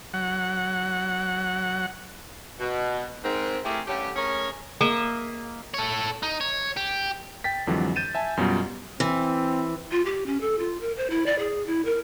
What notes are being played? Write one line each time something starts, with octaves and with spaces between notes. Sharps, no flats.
F#3 F#5
B2
G#2 C4 A#4
A3 C4 E4 G4 G#4 A#4
G2 D3 A3 C#4 G4
A3 C#4 G#4 A#4 C#5
A#3 G#4 D#5 E5
A4 C#5
D#4
C#5
G4
G5 A6 B6
F2 D3 E3 F#3 G#3
G6 A6 D#7 E7
E5 G#5 A5
F#2 B2 F#3 G3 F4
E3 C4
F4
G4
C#4
A4
F4
A#4
C5
E4
D5
G#4
E4
A#4